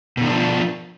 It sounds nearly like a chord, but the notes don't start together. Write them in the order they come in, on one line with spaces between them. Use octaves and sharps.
B2 D#3 D4 F3